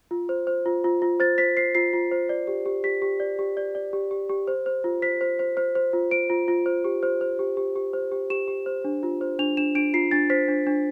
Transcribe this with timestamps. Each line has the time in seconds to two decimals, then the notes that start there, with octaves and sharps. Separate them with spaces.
0.11 F4
0.29 C5
0.47 C5
0.66 F4
0.84 F4
1.02 F4
1.20 C5 A6
1.38 C5 B6
1.57 C5 C7
1.75 F4 C7
1.93 F4
2.12 C5
2.29 D5
2.47 G4
2.66 G4
2.84 G4 B6
3.02 G4
3.20 D5
3.39 G4
3.57 D5
3.75 D5
3.93 G4
4.11 G4
4.29 G4
4.48 C5
4.66 C5
4.84 F4
5.02 C5 B6
5.21 C5
5.39 C5
5.57 C5
5.75 C5
5.93 F4
6.11 C5 D7
6.30 F4
6.48 F4
6.66 C5
6.84 G4
7.03 C5
7.21 C5
7.39 G4
7.57 G4
7.76 G4
7.93 C5
8.12 G4
8.30 G4 E7
8.48 G4
8.66 C5
8.84 D4
9.03 F4
9.21 C5
9.39 D4 F7
9.57 D4 E7
9.75 D4 D7
9.94 F4 C7
10.11 D4 A6
10.30 C5 B6
10.48 D4
10.67 D4